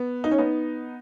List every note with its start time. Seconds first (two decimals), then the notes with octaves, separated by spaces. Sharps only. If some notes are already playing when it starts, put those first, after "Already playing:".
Already playing: B3
0.24 D#4
0.31 C#4
0.38 B3 D#4